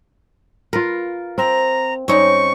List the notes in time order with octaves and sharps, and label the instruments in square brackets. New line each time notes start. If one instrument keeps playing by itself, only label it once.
[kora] F4 A#4 [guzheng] B4
[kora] C4 [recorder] A#5
[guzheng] G#2 G3 C#4 [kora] C4 D#4 [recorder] C#6